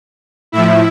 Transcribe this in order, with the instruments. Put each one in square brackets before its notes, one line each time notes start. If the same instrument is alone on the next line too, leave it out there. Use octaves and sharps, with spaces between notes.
[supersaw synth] A2 F3 E4 E5